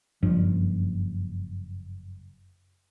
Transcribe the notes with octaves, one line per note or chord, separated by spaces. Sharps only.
F#1 G2 F3